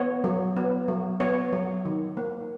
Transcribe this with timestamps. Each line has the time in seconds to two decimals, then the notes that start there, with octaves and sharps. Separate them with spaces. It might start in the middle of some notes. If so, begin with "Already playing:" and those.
Already playing: B3 C#5
0.24 F#3
0.57 B3
0.88 F#3
1.20 B3 C#5
1.53 F#3
1.85 D#3
2.17 A#3